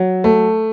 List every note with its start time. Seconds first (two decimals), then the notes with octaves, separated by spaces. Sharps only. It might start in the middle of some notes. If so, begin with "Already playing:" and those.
Already playing: F#3
0.24 A3